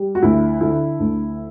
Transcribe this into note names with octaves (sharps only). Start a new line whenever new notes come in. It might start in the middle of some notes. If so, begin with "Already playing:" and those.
Already playing: G3
F#4
D2 E4
D3 E4
D2